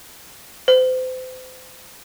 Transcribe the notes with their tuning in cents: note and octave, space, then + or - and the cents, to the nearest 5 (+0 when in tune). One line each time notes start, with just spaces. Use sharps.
C5 -35